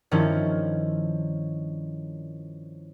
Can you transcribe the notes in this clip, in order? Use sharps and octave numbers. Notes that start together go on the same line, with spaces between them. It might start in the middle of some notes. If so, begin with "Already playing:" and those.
G2 D#3 F3 C#4 D#4 E4